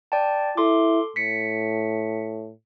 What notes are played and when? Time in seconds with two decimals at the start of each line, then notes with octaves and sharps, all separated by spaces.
0.12 D5 G5 A5
0.57 E4 A4 C6 D6
1.16 A2 B6 C#7